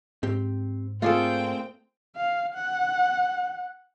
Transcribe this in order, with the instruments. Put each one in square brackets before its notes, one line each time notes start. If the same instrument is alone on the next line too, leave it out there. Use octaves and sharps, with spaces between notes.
[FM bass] G#2 [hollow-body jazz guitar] C4 G4
[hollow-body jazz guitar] A3 A#3 D5 [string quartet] C4 G5 [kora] F4 G#4 A4
[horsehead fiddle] F5
F#5